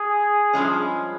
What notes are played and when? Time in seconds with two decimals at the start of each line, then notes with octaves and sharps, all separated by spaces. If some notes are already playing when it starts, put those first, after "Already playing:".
Already playing: G#4
0.53 G2 F3 G#3 C#4